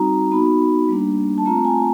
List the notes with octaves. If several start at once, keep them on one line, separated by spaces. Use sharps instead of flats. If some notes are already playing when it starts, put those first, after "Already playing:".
Already playing: G3 C4 D#4 F#4 A#5
B3 D#4 F#4 B5
G3 A#3 D4
A5
A3 C4 F4 A#5
G#5